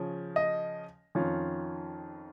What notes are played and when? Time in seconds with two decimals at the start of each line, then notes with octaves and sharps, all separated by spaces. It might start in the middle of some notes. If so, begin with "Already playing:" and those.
Already playing: C#3 F3 C#4
0.36 D#5
1.15 F2 D#3 C#4 F4